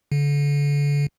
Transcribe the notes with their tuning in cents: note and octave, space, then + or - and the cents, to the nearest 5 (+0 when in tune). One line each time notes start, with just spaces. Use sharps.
D3 -35